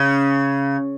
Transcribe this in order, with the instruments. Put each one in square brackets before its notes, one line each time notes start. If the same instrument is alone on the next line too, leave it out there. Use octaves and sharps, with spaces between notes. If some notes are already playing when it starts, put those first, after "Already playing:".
Already playing: [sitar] C#3